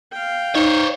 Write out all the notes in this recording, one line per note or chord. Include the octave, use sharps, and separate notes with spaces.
F5 G5
D#4 C5 C#5